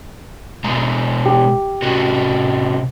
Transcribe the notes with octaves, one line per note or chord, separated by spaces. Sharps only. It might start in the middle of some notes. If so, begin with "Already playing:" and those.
B2 G#3 A#5
G4
C3 C#4 F#4